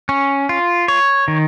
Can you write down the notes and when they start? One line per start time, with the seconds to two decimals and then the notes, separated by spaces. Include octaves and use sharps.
0.09 C#4
0.49 F4
0.88 C#5
1.28 D#3